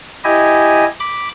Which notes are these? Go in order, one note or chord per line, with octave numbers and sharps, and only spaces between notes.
E4 G4 D#5 G#5
B5 D6